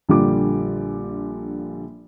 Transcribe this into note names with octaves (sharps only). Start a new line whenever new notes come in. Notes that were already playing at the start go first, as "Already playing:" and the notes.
A#1 D3 G3 F4 D6